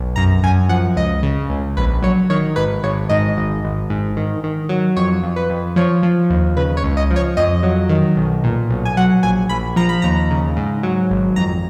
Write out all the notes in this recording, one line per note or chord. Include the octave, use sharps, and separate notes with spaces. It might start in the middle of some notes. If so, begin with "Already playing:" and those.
Already playing: B1
F#2 A#5
F#2 G#5
F3 F#5
C#2 D#5
C#3
C#2
A#1 B4
F#3 C#5
D#3 C#5
G#1 B4
G#1 C#5
G#2 D#5
G#1
G#1
G#2
D#3
D#3
F#3
F2 C#5
F2
B4
F2
F3 C#5
F3
D#2
C#3 B4
C#5
C#2
D#5
F3
C#5
F2 D#5
F#3
D#3
B1
A#2
B1
G#5
F#3 F#5
A#1 G#5
A#1 B5
F3 A#5
B5
D#2 A#5
C#3
G#2
F#3
G#1
F2 A#5